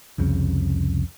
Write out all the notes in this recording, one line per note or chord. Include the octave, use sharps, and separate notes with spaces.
C2 F2 C#3